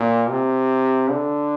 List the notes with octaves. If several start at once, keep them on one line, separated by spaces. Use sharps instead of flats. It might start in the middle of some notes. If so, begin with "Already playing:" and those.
Already playing: A#2
C3
D3